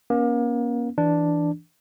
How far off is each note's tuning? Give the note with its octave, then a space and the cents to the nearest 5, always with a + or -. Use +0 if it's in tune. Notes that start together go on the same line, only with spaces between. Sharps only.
A#3 +35 C#4 +0
E3 +0 D4 +0